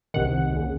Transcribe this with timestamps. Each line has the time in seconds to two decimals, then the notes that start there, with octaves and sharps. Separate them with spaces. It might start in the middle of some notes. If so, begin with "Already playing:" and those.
0.14 C2 C3 D#3 F#5
0.53 D#2 C#3